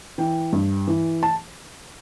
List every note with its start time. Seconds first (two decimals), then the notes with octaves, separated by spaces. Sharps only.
0.18 E3 G5
0.53 G2
0.88 E3
1.23 A5